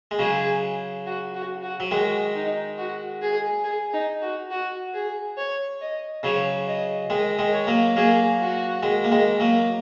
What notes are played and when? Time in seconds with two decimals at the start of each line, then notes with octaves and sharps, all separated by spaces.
0.11 G#3
0.19 C#3 F#3 G#4
1.06 F#4
1.34 F#4
1.63 F#4
1.80 F#3
1.91 D#3 G#3 F#4
2.35 D#4
2.78 F#4
3.22 G#4
3.64 G#4
3.93 D#4
4.22 F#4
4.51 F#4
4.94 G#4
5.37 C#5
5.81 D#5
6.23 C#3 F#3 C#5
6.67 D#5
7.10 D#3 G#3 D#5
7.39 D#3 G#3
7.53 C#5
7.67 F#3 A#3
7.96 F#3 A#3 G#4
8.40 F#4
8.83 D#3 G#3
9.04 A#3
9.11 D#3 G#3
9.40 F#3 A#3